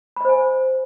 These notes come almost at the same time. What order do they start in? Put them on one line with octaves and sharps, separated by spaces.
B5 D#5 C5 G#5